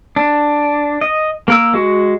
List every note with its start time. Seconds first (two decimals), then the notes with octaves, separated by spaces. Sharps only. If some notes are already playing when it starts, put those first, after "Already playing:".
0.16 D4
1.01 D#5
1.48 A#3 A#4 E6
1.74 G#3 F#4